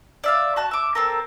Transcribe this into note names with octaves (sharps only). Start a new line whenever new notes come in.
D5 E5 F5
F#4 A5 F#6
E5 D6
C4 A4 A#4